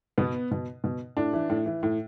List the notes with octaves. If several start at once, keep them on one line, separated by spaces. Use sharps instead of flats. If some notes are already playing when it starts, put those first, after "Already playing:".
B2 B3
B2
B2
A2 D4
E3
A2
E3
A2